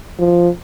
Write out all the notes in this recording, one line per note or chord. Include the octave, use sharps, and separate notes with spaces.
F3